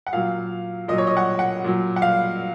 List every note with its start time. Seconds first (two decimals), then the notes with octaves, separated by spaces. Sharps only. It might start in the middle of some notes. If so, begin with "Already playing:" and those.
0.07 F#5
0.13 A#2 F#3 F5
0.88 A#2 F#3 D#5
0.98 C#5
1.07 D#5
1.17 F#5
1.39 F#5
1.64 A#2 F#3
1.96 F#5
2.02 F5